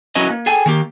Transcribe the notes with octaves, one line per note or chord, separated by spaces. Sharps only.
F#3 C#4 E4 B4 D#5
A#3
G#4 A4 G5 G#5
D#3 A#3 G4